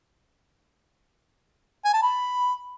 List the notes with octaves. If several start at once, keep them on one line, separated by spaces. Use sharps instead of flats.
G#5
A5
B5